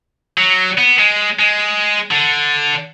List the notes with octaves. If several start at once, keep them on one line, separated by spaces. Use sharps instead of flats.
F#3
B3
G#3
G#3
D3